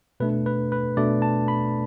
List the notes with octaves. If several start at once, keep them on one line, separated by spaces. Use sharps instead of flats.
B2 A3 D4 B4
B4
B4
B2 A3 D4 D5
A5
B5